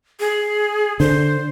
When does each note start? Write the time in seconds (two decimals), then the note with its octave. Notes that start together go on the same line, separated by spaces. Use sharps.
0.20 G#4
1.00 D3 C5